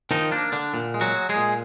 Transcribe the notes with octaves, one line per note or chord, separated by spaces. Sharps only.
D#3 F3 D#4
A#3 D4
D3 D4
A#2
G#3
F#3 F#4
G#3
G#3 G#4
A#2